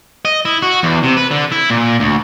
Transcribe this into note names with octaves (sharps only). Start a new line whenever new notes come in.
D#5
E4
F#4
E2
C3
B4
D3
E4
A#2
D2